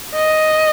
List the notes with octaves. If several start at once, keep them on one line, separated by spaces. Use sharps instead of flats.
D#5